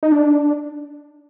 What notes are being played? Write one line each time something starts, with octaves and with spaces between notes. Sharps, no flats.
D#4
D4